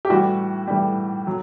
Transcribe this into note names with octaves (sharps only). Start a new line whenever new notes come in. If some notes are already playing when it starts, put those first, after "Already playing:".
G4
A2 E3 G3 F#4
A2 E3 G3
F#3